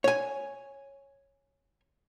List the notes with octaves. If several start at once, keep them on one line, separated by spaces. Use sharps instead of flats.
C#5 G#5